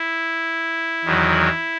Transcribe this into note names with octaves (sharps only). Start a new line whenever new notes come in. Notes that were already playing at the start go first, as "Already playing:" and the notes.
Already playing: E4
E2 D#3 F#3